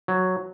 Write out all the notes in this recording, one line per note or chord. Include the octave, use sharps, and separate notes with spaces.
F#3